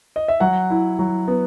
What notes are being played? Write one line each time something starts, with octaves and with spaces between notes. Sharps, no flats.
D#5
E5
F#3 F#5
E4
F#3
B3